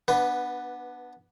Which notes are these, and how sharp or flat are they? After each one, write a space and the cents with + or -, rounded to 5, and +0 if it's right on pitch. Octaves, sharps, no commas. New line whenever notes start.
B3 -10 D4 +15 B4 +10